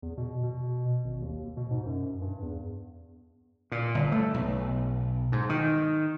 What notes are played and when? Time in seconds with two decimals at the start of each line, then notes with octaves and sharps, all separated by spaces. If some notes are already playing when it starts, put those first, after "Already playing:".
0.02 E2
0.18 B2
0.43 B2
1.04 G#1
1.22 D#2
1.57 B2
1.71 G#2
1.86 F#2
2.21 G2
2.42 E2
3.72 A#2
3.95 G1
4.12 A3
4.34 B1
5.32 G#2
5.49 D#3